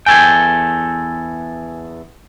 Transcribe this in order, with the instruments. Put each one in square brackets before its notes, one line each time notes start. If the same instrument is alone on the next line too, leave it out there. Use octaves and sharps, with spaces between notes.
[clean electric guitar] E2 A4 G5 [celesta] G#5 G#6